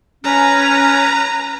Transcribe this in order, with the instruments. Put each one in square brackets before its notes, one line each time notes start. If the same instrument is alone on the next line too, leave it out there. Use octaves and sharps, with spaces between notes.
[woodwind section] C#4 [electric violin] B4 A#5